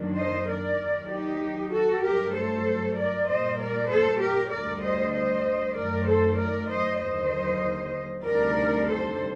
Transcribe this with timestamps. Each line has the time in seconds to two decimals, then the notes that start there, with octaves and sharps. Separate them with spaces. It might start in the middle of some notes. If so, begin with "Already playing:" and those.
Already playing: F#2 D#3 F#3 A#3 D4
0.15 C5 D#5
0.46 A#4 D5
0.78 D#2 D#3 F#3
1.09 D#4 G4
1.71 F#4 A4
2.02 G2 F#3 A3 G4 A#4
2.33 A4 C5
2.95 A#4 D5
3.26 A#2 G3 A#3 C5 D#5
3.58 A#4 D5
3.88 A4 C5
4.20 G4 A#4
4.50 D2 D3 G3 A#4 D5
4.82 C5 D#5
5.13 C5 D#5
5.75 F#2 D#3 A3 A#4 D5
6.06 A4 C5
6.37 A#4 D5
6.68 C5 D#5
7.00 D#2 D3 F#3 A#3 C5 D#5
8.24 D2 C3 D#3 G3 D4 A#4 D5
8.86 A4 C5